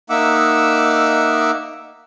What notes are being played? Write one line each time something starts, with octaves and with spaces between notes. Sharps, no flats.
A#3 D#4 E5 F#5 D6 E6